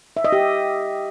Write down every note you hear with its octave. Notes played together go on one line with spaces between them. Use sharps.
E5
D#5
G4